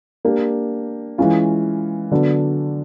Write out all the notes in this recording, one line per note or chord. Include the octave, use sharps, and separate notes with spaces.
A#3 D4 G4
E3 G#3 C#4 F4
D3 F#3 B3 D4 F#4